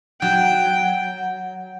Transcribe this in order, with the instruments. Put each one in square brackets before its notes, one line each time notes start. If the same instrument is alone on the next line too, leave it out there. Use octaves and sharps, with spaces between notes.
[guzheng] F#3 [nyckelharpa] G5